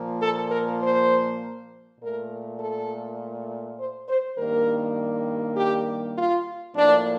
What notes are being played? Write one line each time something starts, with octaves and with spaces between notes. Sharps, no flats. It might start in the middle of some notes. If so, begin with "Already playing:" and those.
Already playing: A#2 F3 A#3
A4
A#4
C5
A#2 A3 A#4
A4
C5
C5
G2 D#3 G3 A#3 A#4
G4
F4
A2 F3 A#3 D4